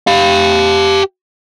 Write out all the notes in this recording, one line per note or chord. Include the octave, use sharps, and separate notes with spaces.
G4 F5